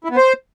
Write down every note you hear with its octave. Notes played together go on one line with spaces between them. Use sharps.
E4
B3
C5